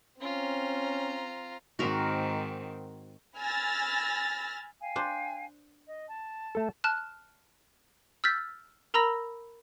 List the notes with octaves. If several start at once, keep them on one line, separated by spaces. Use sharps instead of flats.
C4 C#4 F4 A#5
G#2 D#3 C4 F#4 A#4
G#5 B5 E6 F6 A6 A#6
F5 G5 G#5
D4 C5
D#5
A5
A3 A4
A5 F6 F#6
E6 F6 G6 A6 B6
A#4 A#5 B5 E6 A#6